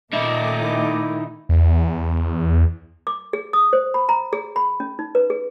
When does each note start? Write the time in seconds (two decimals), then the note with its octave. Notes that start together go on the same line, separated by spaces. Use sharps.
0.13 A#2 D#3 A3 D#4 D#5 E5 A5 D6
0.63 E4
1.49 E2
3.07 D6
3.33 G#4
3.53 D#6
3.73 C5
3.94 B5
4.09 A#5
4.33 G#4
4.56 B5
4.80 C#4
4.99 D#4
5.15 B4
5.30 G#4